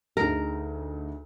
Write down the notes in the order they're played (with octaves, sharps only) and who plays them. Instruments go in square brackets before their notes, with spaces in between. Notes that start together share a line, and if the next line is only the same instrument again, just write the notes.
[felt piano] D2 D#4 G#4 [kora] A#4